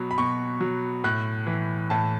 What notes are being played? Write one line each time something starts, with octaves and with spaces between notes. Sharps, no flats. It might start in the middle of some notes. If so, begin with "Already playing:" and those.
Already playing: B2 F#3 B5
B5
B2 C#6
F#3
A2 F#6
E3
A2 A5